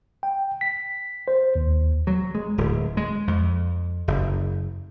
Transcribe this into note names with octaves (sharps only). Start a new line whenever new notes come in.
G5
B6
C5
D#2
F#3
G#3
D1
G#3
F2
F#1